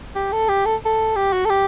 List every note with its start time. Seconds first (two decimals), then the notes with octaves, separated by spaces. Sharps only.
0.15 G4
0.33 A4
0.49 G4
0.66 A4
0.86 A4
1.16 G4
1.33 F#4
1.45 A4
1.50 G4